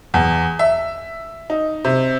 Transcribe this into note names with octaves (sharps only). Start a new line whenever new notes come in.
E2
E5
D#4
C3